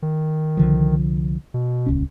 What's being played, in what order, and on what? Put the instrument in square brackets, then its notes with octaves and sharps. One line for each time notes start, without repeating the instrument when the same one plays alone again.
[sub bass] D#3
[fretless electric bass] C2 D3 F3
[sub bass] B2
[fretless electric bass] D#1 C#2 C#4